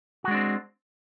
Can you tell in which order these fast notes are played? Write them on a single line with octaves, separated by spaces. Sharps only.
F#4 G#3 D4 C4